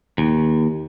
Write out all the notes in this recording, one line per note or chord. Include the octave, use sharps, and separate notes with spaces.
D#2